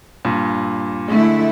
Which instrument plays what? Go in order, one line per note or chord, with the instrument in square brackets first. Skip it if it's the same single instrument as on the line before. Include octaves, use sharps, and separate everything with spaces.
[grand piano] G2 A#2
[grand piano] D3 G#3 [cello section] A3 E4